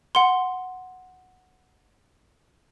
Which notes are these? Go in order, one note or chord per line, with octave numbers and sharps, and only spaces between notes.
F#5 C6